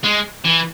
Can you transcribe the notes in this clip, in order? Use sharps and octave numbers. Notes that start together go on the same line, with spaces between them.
G#3
E3